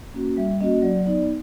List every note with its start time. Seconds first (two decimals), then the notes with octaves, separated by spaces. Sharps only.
0.14 A#3 C#4 F#4
0.37 G3 E5
0.61 A#3 C#4 F#4 D#5
0.82 F#3 D5
1.06 B3 D#4 D5